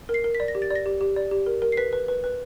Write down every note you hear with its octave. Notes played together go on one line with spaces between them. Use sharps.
A#4
C7
A#4
B6
D5
A#6
G4
A6
D5
A#6
G4
G4
D5
G4
A#4
A#4
C7
B4 B6
B4
B4
B4